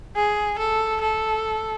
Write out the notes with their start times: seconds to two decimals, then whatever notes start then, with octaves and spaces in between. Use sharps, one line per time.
0.16 G#4
0.59 A4
1.01 A4